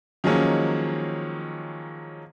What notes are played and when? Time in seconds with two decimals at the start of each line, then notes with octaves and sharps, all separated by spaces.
0.24 D#3 F3 F#3 G#3 A#3 C#4